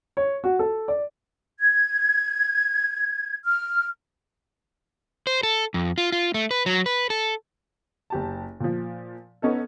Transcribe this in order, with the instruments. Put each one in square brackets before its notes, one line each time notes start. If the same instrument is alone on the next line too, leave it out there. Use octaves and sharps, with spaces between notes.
[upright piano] C#5
F#4
A4
D5
[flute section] G#6
F6
[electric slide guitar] C5
A4
F2
F4
F4
A3
B4
F#3
B4
A4
[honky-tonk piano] F#1 G4 A5
A#2 F3
B3 C#4 D#4 A4